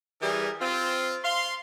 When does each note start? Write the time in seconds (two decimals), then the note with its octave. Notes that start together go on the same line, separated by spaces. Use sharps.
0.22 E3 G3 E4 G#4 A#4
0.61 C4 F4
1.24 F5 C6